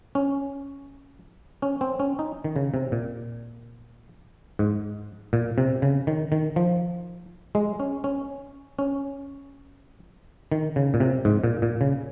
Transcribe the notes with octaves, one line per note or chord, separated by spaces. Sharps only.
C#4
C#4
C4
C#4
D#4
D#3
C#3
C3
A#2
G#2
A#2
C3
C#3
D#3
D#3
F3
G#3
C#4
C#4
C#4
D#3
C#3
A#2
C3
G#2
A#2
A#2
C#3